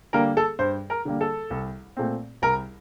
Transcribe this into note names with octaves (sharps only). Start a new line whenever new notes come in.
D3 G3 A#3 A#4
A4
G2 C5
A#4
D3 G3 A#3
A4
C2
A#2 A3 C4
C2 A#4